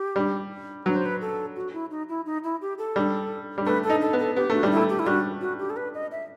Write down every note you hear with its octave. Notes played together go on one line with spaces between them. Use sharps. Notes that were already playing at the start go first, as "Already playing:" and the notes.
Already playing: G4
G3
F#3 B4
C5
B4
A4
F#4
E4
D#4
E4
D#4
E4
G4
A4
G3
G3
A3 B4
A4
D#4
A4
B3
A4
B3 G4
A3 F#4
G3 D#4
E4
A3
G4
E4
G3 F#4
F#4
G4
A4
B4
D#5
E5